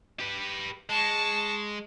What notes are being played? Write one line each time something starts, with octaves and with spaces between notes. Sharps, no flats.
G4 B4
G#3 A5 C#6